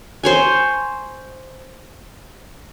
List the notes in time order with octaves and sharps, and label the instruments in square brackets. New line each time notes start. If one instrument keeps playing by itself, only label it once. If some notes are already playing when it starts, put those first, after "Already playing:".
[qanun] C5 C#5 G#5